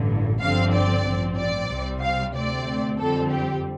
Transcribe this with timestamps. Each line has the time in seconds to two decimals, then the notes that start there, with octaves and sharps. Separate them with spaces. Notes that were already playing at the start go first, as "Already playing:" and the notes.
Already playing: A1 G2 D3
0.41 G1 G2 D3 F3 C4 F5
0.73 D5
1.05 A1 G2 F3 C4
1.38 D5
1.70 C2 C3 G3 C4
2.02 F5
2.34 D2 C3 A3 C4 D5
2.99 F2 D3 G3 C4 A4
3.31 G4